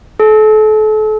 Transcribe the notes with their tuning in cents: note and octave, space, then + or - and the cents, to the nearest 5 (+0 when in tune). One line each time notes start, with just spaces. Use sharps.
A4 -35